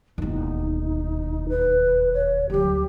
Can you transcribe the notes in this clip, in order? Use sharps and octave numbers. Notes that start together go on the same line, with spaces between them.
E1 D#2 D#4
B4
C#5
D2 F#3 G4